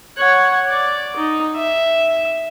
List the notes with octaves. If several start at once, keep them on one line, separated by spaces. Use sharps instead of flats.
C#5 F#5
D5
D#4
E5